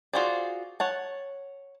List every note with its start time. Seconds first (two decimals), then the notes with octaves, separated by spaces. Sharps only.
0.13 F4 F#4 G#4 C5 D5
0.80 C#5 F#5 A5